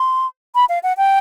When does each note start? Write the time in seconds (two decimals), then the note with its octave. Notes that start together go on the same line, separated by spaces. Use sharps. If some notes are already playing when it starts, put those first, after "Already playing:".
Already playing: C6
0.55 B5
0.69 F5
0.83 F#5
0.97 G5